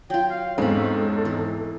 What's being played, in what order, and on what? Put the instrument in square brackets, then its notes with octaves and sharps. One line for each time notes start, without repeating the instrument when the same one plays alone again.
[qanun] F#3 F4 [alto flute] G5
[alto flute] F5
[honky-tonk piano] E2 G#2 C4 [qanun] C#4 B5 [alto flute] A4
[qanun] E3